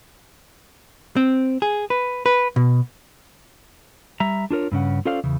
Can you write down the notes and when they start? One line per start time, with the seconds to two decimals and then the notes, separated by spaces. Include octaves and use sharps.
1.16 C4
1.62 G#4
1.90 B4
2.26 B4
2.56 B2
4.20 G3 E5 A#5
4.51 D4 F4 A#4 C#5
4.72 G2 C#3 C#4 F#5
5.05 C#4 F4 A4 C5 D5 F5
5.24 E2 C#3